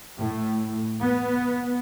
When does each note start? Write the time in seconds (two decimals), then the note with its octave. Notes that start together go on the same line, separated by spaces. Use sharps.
0.16 A2
0.99 B3